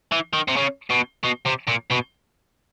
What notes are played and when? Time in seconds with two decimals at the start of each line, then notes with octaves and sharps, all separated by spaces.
0.12 E3
0.33 D#3
0.48 C3
0.56 C#3
0.90 B2
1.23 B2
1.45 C3
1.67 A#2
1.90 B2